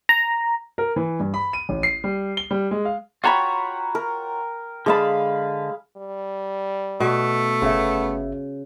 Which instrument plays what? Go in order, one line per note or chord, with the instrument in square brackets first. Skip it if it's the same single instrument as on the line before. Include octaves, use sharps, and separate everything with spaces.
[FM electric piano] A#5
[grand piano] A#4
E3
G2
B5
D#7
A1
C7
G3
G7
G3
G#3
F5
[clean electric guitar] F4 F#4 C#5 [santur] G5 A#5 B5
[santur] A#4
[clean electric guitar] D3 G#3 A5 [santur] G#4 F5 B5
[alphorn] G3
[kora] B2 [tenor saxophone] A3
[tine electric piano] G1 E5 [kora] C#3 [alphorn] B3